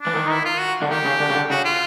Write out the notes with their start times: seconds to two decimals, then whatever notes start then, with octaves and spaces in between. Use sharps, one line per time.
0.01 D4
0.07 E3
0.15 D#3
0.31 E4
0.45 F4
0.60 F#4
0.82 D3
0.90 D#3 G4
1.05 C#3
1.20 D3
1.29 C#3
1.35 D3
1.50 C#3 F#4
1.65 F4